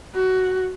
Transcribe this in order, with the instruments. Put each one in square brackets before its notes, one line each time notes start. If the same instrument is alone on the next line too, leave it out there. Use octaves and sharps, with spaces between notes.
[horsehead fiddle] F#4